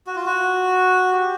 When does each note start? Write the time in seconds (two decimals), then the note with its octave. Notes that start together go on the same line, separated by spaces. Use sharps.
0.07 F#4
0.16 F4
0.26 F#4
1.12 G4